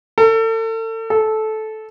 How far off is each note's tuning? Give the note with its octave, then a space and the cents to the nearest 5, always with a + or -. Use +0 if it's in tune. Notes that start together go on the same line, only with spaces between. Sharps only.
A4 +35
A4 -15